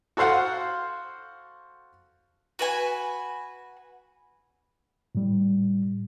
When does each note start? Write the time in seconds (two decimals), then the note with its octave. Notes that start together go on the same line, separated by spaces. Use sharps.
0.17 F#4 A4 C5 F5 F#5
2.59 F#4 B4 G#5
5.15 A2 G3